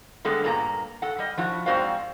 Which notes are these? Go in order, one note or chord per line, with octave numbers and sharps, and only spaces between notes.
D3 G3 G#3 B3 A4
G2 A#2 A#3 F#4 A#5
A4 F#5
G3 D#5
F3 E4 F#4
G#2 C4 F#4 C5 D5 F5